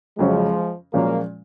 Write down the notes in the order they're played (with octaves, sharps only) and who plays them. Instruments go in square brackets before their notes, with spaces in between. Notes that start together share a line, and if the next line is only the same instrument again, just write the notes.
[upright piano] F2 C#3 F#3 C#4 [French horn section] F3 G#3
[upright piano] A#2 F3 G#3 C#4 [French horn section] F#3 A#3